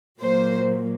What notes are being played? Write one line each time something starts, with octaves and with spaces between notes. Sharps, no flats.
A#2 F#3 A#3 C5